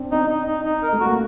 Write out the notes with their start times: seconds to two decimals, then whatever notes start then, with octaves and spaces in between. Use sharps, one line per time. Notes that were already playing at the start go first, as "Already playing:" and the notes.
Already playing: C4 D4
0.12 C4 D#4
0.30 D#4
0.47 D#4
0.65 D#4
0.83 A#4
0.93 A3
1.00 F#4
1.05 A#3